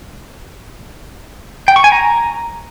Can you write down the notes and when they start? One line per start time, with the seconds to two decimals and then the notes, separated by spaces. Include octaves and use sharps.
1.68 G5
1.76 C#6
1.84 G#5
1.92 A#5